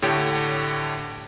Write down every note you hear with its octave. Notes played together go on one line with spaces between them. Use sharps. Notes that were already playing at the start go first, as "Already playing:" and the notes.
A2 D3 G4 C#5 G5